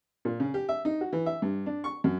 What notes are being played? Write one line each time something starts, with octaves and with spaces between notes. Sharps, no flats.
A#2
C#3
G4
E5
D#4
F#4
E3
E5
G2
D4
C#6
F#2